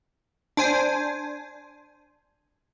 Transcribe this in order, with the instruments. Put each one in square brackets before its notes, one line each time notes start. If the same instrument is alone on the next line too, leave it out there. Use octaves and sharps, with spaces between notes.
[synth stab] D4 C5 G#5